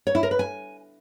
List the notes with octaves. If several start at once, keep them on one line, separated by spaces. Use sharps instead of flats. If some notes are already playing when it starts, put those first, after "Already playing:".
C#5
E4
A#4
B4
G#5